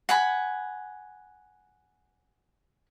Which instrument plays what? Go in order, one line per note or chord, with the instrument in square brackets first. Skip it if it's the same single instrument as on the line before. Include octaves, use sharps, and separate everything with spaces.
[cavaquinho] F#5 G#5 B5